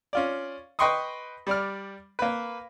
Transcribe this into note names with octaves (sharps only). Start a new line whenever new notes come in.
C#4 F4 D5
B4 D#5 G5 C6 C#6 D#6
G3 D5 F6
A#3 B4